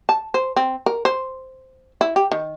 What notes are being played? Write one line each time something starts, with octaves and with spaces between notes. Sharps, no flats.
A5
C5
C4
A#4
C5
E4
G4
D#3